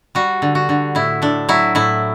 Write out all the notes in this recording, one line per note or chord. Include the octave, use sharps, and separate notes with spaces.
G3 F#4
D3
F#4
D3
A2 E4
A2 D4
F#3 E4
A2 E4